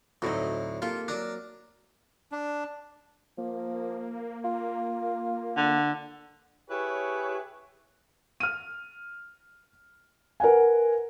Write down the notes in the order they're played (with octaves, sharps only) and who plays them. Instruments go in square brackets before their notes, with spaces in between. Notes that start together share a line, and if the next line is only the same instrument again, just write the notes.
[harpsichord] D2 A2 [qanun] F#3 C4 D#4
[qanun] A#3 G4 A4 [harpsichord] F4
[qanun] F#3 A#4 A#5 [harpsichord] D4
[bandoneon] D4
[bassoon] F3 [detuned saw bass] A#3
[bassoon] F4
[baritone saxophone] D3
[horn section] E4 G4 G#4 B4 C#5
[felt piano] F6 D#7
A#4 B4 F#5 G#5